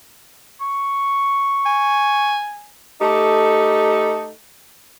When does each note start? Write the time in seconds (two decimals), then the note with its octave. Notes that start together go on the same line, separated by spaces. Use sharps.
0.61 C#6
1.66 G#5
3.01 A3 D#4 G4 A4